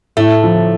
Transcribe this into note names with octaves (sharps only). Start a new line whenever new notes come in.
A2 A3
F3